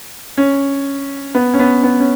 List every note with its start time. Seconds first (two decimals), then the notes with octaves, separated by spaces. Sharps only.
0.38 C#4
1.35 B3
1.54 C#4
1.59 B3
1.83 B3
2.00 C#4